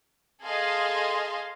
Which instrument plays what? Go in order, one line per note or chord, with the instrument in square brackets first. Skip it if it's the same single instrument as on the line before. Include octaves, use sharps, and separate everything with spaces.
[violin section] G#4 A4 D#5 F5 C6